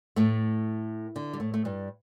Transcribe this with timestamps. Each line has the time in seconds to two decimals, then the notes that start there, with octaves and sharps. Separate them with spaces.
0.16 A2 A3
1.16 D3
1.33 G3
1.40 A2 A3
1.54 A3
1.65 G2 G3